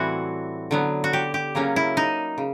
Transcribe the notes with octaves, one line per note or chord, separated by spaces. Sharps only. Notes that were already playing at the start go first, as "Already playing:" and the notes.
Already playing: A2 E3 G3 C4 E4 F#4
D3 F#3 B3
F#4
G4
G4
C#3 F#3 A#3 C#4
E4
D#4
C#3